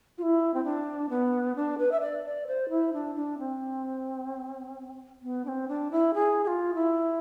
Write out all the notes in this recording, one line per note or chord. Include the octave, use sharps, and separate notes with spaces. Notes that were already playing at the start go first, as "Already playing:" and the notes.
F4
E4
C4
D4
B3
D4
B4
E5
D5
D5
C5
E4
D4
D4
C4
B3
D4
C4
D4
E4
G#4
G#4
F4
E4